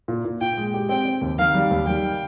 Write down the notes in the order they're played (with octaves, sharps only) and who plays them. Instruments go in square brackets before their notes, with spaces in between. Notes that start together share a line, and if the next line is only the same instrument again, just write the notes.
[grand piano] A#2
A#2
[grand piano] A#2 [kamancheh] G5
[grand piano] G#3
G4
[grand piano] C4 [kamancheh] G5
[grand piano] C4
D#2
[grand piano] D#3 [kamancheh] F5
[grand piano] G3
D#2
[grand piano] G3 [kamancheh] G5